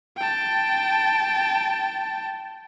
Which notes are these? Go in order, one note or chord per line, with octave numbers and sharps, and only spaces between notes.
G5 A5